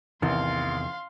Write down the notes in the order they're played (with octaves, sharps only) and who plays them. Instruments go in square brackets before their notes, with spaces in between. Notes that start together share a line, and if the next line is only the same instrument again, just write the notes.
[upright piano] A1 [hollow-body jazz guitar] E2 C3 D#3 [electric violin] F5 C6